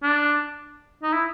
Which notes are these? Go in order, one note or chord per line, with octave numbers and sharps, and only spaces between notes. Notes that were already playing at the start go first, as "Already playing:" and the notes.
D4
D#4
E4